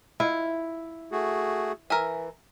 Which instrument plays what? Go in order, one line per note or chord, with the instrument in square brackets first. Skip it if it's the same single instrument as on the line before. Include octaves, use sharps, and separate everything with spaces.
[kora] E4 [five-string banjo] F4
[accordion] A3 F#4 G#4
[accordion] E3 [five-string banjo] A#4 E5 G#5